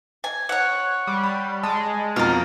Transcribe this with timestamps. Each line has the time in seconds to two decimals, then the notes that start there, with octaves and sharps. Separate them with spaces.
0.24 G#5
0.49 C#5 F#5
1.07 G3
1.24 B5
1.63 G#3 A5
2.16 F2 B2 F4 A#4